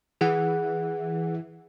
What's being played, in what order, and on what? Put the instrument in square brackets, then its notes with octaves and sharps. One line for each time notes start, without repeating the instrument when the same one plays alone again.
[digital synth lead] E3 [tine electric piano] G#4 F#5